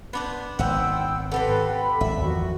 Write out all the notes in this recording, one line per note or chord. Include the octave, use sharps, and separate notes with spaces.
B3 D4 C5
G#1 B3 C4 C5 F#5 G5 E6
C4 G4 A4 B4 F#5
B5
G#1 E5
E2 D#3 F3 F#4